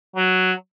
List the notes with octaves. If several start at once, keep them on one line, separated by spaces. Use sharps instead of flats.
F#3